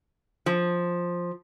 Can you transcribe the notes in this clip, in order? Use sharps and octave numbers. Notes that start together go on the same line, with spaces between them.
F3